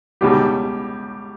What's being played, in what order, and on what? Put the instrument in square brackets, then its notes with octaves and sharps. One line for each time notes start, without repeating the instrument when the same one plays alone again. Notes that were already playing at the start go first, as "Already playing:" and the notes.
[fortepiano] C#2 B2 G3 [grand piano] G4